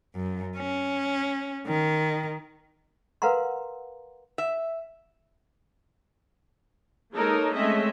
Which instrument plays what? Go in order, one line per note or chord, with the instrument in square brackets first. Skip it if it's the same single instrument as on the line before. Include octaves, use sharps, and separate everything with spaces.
[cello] F#2
C#4
D#3
[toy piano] A#4 B4 F5 F#5 A#5 C6
[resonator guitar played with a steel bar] E5
[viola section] G#3 A#3 D#4 A4 A#4 C#5
G#3 A3 C4 C#4 D#5 E5